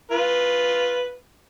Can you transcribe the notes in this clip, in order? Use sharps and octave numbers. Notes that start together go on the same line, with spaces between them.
F4 B4